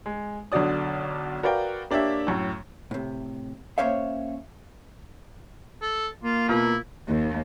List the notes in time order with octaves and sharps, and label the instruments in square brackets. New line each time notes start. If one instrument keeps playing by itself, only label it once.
[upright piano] G#3
B1 D3 D4 F#4 D5 D#6
F#4 A#4 B4 D5 F5 G5
A#3 D4 G4 C#5 E5
F#2 A2
[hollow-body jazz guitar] A2 C3
A#3 C#4 C5 C#5 E5 F5
[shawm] A4
[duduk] A#3 [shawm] F4
[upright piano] B2 F4 A#4 [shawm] E4
[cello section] D#2